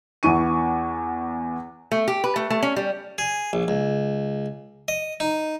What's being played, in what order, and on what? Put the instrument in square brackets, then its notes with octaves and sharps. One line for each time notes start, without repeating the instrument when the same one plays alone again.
[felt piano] E2 B3 E4 C#6 D#7
[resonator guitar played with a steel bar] A3
G4
B4
A3
A3
C#4
G3
[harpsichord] G#4
A#1
C#2
D#5
D#4